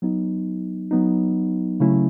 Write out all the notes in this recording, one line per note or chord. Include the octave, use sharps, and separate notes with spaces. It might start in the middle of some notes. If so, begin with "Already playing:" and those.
F#3 B3 D#4
F#3 B3 D#4
C#3 F#3 A3 C#4 E4